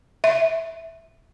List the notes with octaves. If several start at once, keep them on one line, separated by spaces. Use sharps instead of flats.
E5